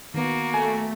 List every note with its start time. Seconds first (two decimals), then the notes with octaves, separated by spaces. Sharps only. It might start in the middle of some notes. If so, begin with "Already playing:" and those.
0.14 D#3 A#3 B3 F#4
0.54 A3 G#5